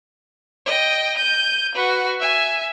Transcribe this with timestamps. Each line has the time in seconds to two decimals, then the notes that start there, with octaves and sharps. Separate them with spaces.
0.66 D#5 G5
1.17 G6 D#7
1.75 F#4 B4
2.20 E5 G#5